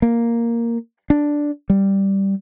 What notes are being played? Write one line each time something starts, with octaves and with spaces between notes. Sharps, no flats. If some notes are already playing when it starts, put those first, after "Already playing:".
A#3
D4
G3